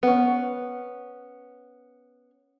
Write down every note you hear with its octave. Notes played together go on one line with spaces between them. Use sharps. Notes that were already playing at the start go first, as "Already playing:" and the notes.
B3 C#4